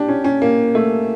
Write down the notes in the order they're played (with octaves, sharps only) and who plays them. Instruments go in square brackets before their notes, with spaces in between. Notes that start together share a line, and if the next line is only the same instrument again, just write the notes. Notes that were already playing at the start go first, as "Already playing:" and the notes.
Already playing: [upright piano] D4 G4
C#4
C#4
A#3
A3